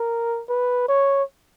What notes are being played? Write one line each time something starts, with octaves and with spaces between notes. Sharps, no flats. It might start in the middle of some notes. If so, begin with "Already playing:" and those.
Already playing: A#4
B4
C#5